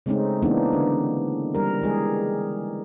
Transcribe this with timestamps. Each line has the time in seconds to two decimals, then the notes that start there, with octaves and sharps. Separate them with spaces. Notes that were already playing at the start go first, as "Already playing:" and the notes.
0.06 C#3 G#3 A3 C4 C#4 D#4
0.42 E3 A#3 B3 D4 D#4
0.73 D3
1.55 G3 A#4
1.82 E3 G#3 G#4